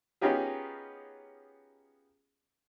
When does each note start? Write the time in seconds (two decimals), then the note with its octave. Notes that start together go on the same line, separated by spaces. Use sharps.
0.21 B3 C#4 D#4 F4 G4 G#4